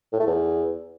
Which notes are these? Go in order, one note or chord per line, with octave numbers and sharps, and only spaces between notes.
A2
A3
E2